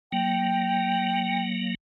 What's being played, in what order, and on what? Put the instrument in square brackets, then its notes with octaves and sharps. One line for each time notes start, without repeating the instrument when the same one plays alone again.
[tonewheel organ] F#3 A#3 [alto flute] G5